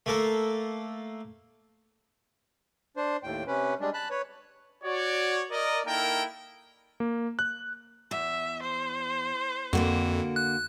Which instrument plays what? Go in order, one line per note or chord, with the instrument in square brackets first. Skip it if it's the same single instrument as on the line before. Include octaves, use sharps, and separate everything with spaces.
[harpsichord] A3 A#3 A4
[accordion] D4 C5
D#2 A2 G5
C3 C#4 B4
G3 G#3 D4
A5 B5 F#6
B4 C#5
[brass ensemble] F#4 C#5 D5
A#4 D5 D#5
A#3 D#4 E4 A4 A#4 G5
[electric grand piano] A#3
F#6
[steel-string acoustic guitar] E2 [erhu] E5
[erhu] C5
[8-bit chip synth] F2 [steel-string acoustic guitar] D3 A#3 F#4
[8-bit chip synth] F#6